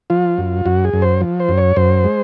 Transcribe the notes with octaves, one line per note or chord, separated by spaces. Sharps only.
F3 F4
F#2
F#2 F#4
G#4
F#2
C5
F3
C5
F#2
C#5
F#2 C5
G#3